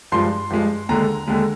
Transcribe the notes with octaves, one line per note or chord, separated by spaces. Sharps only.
G2 F3 G#3 C6
G2 F3 G#3
D#2 D3 G#3 A#5
D#2 D3 G#3